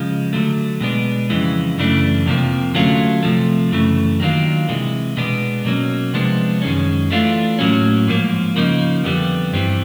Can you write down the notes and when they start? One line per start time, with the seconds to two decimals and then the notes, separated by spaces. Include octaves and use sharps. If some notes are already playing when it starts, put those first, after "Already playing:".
Already playing: C#3 F3 G#3
0.33 D3 F#3 A3
0.81 B2 G#3 B3 D4
1.30 F2 C#3 E3 G#3
1.78 F#2 C#3 E3 A3 D4
2.26 F2 C3 F3 A#3
2.74 D3 F#3 A3 C#4 F4
3.23 C3 F3 A3
3.71 F#2 C#3 E3 A3
4.20 D#3 F#3 A#3 D4 F4
4.69 C3 E3 G#3
5.17 B2 G#3 B3 D4
5.65 B2 F#3 A#3 C#4
6.14 C3 F3 G#3 B3 D4
6.62 F#2 D#3 G#3 C#4
7.11 E3 A3 D4 F4
7.59 A2 F#3 A#3 C#4
8.08 G#2 F3 A#3
8.56 C#3 F3 A#3 D#4
9.04 F2 D3 G3 B3
9.53 G2 E3 G3 C4